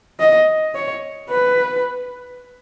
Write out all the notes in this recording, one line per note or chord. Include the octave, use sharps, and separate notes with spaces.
D#5
C#5
B4